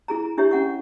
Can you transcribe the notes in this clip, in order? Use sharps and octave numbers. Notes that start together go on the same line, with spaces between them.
E4 G#4 A#5
D4 E4 G4 C#5 E5
C#4 F#5 C#6